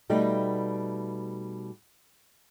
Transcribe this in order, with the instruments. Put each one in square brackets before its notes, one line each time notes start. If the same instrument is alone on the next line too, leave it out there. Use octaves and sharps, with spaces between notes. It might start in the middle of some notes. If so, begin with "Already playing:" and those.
[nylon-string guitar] B2 G3 A3 D#4